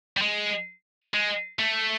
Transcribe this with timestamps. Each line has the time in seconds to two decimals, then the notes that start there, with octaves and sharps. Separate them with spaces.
0.17 G3
0.22 G#3
1.14 G#3
1.59 A3